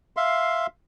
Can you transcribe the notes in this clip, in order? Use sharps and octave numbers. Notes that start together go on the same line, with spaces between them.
E5 F5 C6